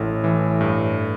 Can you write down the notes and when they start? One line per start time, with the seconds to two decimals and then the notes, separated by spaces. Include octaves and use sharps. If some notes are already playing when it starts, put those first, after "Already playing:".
Already playing: A1 A2
0.24 E3
0.61 G2